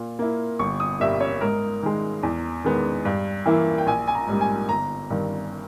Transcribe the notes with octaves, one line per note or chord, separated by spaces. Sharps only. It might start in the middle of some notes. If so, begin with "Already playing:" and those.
Already playing: A#2
A#3 E4
G1 C#6
D#6
G2 G3 A#3 E5
C#5
G#2 A#4
D#3 G#3
E2
D#3 G#3 B3
G2
E3 A#3 E4
G5
A#1 G#5
G#5
A#5
G#2 G3 A#3
G#5
G1 A#5
G2 D#3